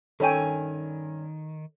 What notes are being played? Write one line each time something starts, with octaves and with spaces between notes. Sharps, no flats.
G2 D#3 C#4 A4 C#5 G5 G#5